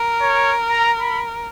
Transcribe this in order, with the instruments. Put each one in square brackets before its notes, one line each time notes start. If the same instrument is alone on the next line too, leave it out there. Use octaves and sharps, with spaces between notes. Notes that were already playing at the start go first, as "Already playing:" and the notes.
Already playing: [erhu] A#4
[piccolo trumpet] C#5
A#5
B5